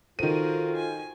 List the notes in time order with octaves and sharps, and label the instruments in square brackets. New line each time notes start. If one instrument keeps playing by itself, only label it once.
[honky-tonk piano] D#3 D#7 [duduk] F4 [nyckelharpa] F#4 A#4 [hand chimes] A4 C5
[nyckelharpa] G#5